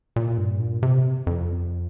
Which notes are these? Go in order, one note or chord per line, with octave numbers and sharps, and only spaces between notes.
A#2
G2
A#2
C3
F2